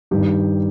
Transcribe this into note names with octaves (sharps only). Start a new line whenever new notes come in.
G2 D#3 G3 D#4 G4